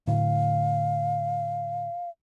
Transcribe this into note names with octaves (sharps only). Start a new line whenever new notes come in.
A2 D3 F5